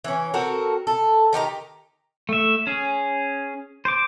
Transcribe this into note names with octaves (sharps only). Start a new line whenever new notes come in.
E3 C#4
C4 F#4 A4 A#4
A4
D#3 D#4 G4 A#5
A3 E5
C#4 G#4
C5 D6